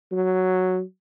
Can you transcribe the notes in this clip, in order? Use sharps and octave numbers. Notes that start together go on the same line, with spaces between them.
F#3